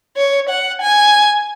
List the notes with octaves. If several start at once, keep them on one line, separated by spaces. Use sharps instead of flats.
C#5
F#5
G#5